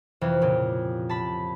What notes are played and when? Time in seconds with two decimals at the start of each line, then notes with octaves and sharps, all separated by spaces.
0.21 F2 C3 E3
0.42 A#2 C#3 G4
1.09 A5 B5